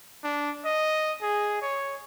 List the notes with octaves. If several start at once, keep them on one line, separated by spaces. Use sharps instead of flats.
D4
D#5
G#4
C#5